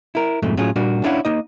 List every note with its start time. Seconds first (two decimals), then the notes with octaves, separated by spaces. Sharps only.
0.15 E4 A#4
0.42 F2 G#2 B2 A3
0.57 A2 F#3 C#4 F4 G#4
0.76 A#2 G3 A#3 D4 F#4
1.04 C#4 D4 E4 C#5 F5 F#5
1.25 A#3 D#4 D#5